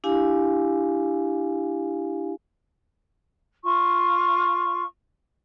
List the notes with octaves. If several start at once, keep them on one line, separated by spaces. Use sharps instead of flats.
D4 E4 G4 F5 G#5
F4 C#6